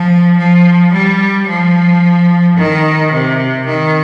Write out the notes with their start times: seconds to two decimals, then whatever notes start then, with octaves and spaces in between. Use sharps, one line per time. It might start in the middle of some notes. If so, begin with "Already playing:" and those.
Already playing: F3
0.38 F3
0.93 G3
1.48 F3
2.57 D#3
3.12 C3
3.67 D#3